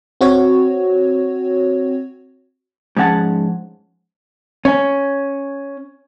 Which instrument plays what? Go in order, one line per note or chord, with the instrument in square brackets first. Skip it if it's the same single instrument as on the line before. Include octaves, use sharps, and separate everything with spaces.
[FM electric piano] C4 F#4 C#5
[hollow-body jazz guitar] G#2 F3 C#4 F#5 A5
C#4